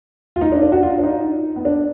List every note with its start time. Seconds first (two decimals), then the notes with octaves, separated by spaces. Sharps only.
0.36 F4
0.41 D#4
0.52 D4
0.62 D4
0.72 F#4
0.83 F4
0.98 D4
1.03 D#4
1.56 B3
1.65 D4